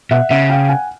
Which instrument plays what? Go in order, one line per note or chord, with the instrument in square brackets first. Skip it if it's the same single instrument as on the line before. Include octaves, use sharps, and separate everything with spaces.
[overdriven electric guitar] B2 [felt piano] E5 F#5
[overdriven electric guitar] C#3 [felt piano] E5 F#5
[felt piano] F5 G5
F#5 G#5